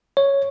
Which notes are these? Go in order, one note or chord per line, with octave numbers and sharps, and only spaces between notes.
C#5